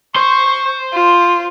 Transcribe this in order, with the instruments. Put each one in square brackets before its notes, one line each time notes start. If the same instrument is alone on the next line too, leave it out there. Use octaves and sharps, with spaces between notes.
[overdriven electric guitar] C5 C6 [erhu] C#6
[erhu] F4